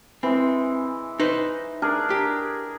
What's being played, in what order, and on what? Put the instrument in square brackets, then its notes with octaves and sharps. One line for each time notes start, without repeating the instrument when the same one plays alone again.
[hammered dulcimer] E3 G#3 [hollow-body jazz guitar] C4
[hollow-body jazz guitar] D#4 B4 C5
[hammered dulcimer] D4 G#4 A#4
[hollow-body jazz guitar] G4